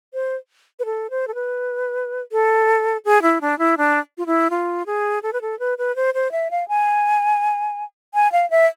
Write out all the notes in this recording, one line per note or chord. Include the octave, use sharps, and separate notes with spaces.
C5
B4
A4
C5
A4
B4
A4
G#4
E4
D4
E4
D4
F4
E4
F4
G#4
A4
B4
A4
B4
B4
C5
C5
E5
F5
G#5
G#5
F5
E5